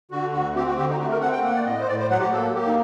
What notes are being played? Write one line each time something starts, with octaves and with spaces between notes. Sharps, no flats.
D3 F#4
D2 F#4
C4 G4
F#4
D3 G4
D#4
A3 F#4
A#4
C4 F#5
G5
A#3 F#5
D5
A2 D#5
C5
A2 D5
C5
F#3 F#5
G4
A#3 A4
A#3 G4
D#4